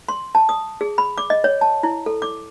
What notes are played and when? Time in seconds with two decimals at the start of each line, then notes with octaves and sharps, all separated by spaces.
0.09 C6
0.35 A5
0.49 D#6
0.81 G#4
0.98 B5
1.18 D6
1.30 D#5
1.44 C#5
1.61 A5
1.83 E4
2.06 A4
2.22 D6